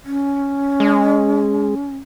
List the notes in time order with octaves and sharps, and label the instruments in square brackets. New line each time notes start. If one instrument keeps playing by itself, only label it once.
[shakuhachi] C#4
[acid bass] G#3